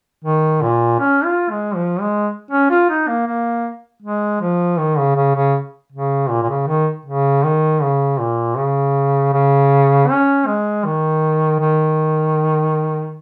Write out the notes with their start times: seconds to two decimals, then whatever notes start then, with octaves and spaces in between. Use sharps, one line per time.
0.24 D#3
0.62 A#2
1.00 C#4
1.25 F4
1.51 G#3
1.75 F3
2.01 G#3
2.51 C#4
2.70 F4
2.89 D#4
3.08 A#3
3.27 A#3
4.02 G#3
4.41 F3
4.79 D#3
4.98 C#3
5.16 C#3
5.35 C#3
5.92 C#3
6.30 A#2
6.42 A#2
6.49 C#3
6.67 D#3
7.06 C#3
7.44 D#3
7.82 C#3
8.20 A#2
8.57 C#3
9.33 C#3
10.09 C#4
10.47 G#3
10.85 D#3
11.60 D#3